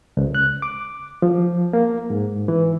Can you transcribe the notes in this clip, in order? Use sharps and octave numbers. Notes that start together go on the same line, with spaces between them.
C#2
F#6
D6
F3
A#3
G#2
E3